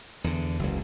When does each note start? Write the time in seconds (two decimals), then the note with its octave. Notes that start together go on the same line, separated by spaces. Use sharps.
0.24 E2 D3
0.59 F#1 C#2